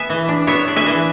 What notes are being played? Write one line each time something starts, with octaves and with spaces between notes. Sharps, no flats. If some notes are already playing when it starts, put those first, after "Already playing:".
Already playing: B3 E5 G#5
E3
D4
B3 C#5 E5
D4
E5 G#5
E3